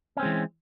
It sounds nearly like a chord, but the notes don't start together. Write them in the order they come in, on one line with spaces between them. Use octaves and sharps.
C#4 C4 G#3 E3